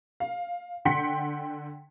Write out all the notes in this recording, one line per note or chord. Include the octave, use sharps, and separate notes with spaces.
F5
D3 F#5 G5 C6 B6 C#7